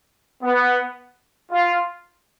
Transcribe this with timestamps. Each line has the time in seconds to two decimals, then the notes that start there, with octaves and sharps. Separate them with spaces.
0.42 B3
1.52 F4